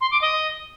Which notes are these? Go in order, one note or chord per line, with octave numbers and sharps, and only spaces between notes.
C6
D6
D#5